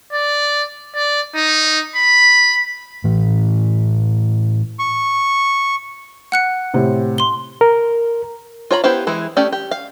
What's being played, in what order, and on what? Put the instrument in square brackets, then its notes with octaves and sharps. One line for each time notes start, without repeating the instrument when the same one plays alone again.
[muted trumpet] D5
D5
D#4
B5
[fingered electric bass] A2 E3
[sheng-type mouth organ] C#6
[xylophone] F#5 F#6 C#7
[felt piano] A2 C3 C4
[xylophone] C6 G7
[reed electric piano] A#4
[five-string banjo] F4 C#5 A#5 B5
B3 E4 G4 C5 F5
E3 G#3 E4
A3 C#4 G4 D5
G4
F5